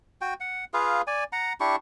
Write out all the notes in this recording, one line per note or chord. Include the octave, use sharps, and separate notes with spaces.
F#4 G5
F#5
F4 G#4 B4 F5
D5 G#5
F#5 A#5
D4 E4 G4 C#6